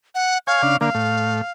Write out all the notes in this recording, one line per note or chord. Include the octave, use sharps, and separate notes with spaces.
F#5
C#5 F5 G#5
C#3 D4
D3 A#3 F5
A2